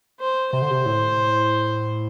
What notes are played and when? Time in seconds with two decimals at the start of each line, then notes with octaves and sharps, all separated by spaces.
0.20 C5
0.53 C3 C5
0.62 D3
0.71 C3
0.86 A2